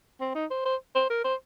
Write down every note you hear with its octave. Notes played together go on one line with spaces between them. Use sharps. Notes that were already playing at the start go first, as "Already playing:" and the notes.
C4
D#4
C5
C5
C5
A#4
C5